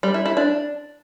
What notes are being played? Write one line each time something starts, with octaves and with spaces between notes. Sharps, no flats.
G3
E4
E4
D4